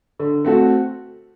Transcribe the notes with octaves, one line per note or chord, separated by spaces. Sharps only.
D3
A3 C4 F#4 A4